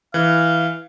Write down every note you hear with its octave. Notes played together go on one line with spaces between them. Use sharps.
E3 F5